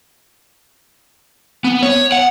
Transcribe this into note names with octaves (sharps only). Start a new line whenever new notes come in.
B3
C#5
F#5